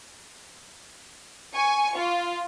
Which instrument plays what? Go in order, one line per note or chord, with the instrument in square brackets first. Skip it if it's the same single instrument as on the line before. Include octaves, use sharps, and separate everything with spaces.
[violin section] G#5 C#6
F4